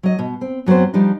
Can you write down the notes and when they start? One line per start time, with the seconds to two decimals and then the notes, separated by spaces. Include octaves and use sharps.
0.03 F#3 D#5
0.19 B2
0.41 C4
0.66 F#2 F#3 B3 C4 C5
0.94 F3 G3 D4 D#4